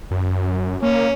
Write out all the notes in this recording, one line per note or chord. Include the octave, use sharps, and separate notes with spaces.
F#2
A#3 C#4